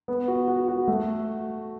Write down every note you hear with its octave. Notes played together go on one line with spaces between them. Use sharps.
B3
F#4
F#4
F#4
A3